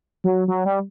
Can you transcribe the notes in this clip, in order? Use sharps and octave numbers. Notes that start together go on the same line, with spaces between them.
F#3
F#3
G3